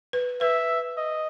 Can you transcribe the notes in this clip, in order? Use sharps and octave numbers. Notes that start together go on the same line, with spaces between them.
B4
B4 E5
D#5